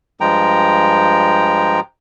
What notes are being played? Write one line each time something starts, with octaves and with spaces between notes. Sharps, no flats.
G2 F3 G#3 G5 A#5